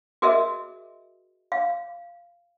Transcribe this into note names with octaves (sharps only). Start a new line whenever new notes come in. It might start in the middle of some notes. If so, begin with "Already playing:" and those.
F#4 G#4 A#4 D#5 E5
F5